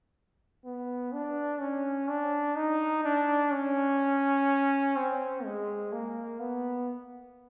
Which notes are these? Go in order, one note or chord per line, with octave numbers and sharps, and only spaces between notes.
B3
D4
C#4
D4
D#4
D4
C#4
C4
G#3
A#3
B3